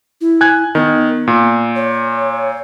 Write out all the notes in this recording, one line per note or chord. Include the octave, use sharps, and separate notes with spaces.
E4
G#5 F#6 G#6
D#3 B3
A#2
C#5